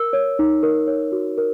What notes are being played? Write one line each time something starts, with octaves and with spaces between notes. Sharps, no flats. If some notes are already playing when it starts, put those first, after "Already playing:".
Already playing: A#4 E6
C#5
D#4
A#4
C#5
F#4
A#4